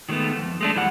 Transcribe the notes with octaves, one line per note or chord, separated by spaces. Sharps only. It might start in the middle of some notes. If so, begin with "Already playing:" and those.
D#3 F#3 G#3 A3 B3
F2
G#3 A3 D4
F#2 E3 G3 G4 F#5